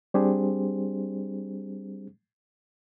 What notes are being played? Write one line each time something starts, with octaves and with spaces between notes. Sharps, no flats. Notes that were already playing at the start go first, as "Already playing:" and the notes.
G3 C4 D4 G4 G#4 C5